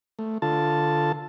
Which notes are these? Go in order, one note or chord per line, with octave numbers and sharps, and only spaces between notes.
A3
D3 F4 A4 A5